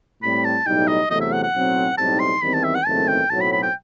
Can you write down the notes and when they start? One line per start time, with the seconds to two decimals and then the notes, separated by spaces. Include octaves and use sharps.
0.22 A2 G3 C4 B5
0.45 A5
0.65 B1 A2 G3 D#4 G5
0.88 D#5
1.10 E2 C3 F#3 A3 D#5
1.21 E5
1.33 F#5
1.43 F#5
1.54 B1 A2 F#3 C4
1.98 B1 A2 G3 C4 D#4 A5
2.19 C6
2.42 E2 D#3 G3 C4 B5
2.54 A5
2.64 E5
2.75 F#5
2.86 F#1 E2 D#3 A3 C4 A5
3.08 G5
3.30 B1 A2 F#3 C4 A5
3.41 B5
3.52 B5
3.62 G5